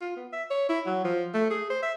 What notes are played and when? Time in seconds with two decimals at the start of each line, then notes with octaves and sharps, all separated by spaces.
0.01 F4
0.16 B3
0.33 E5
0.50 C#5
0.69 E4
0.86 F#3
1.05 F3
1.34 A3
1.50 G#4
1.70 C5
1.83 E5